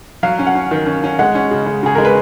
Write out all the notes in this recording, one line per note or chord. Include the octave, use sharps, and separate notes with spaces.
F#3 F5
C#4
F#5
C#4
D#3
C#4
C#4
G#3 F#5
C#4
C#3
G#3
C#3 G#4
G#3 A#4
B4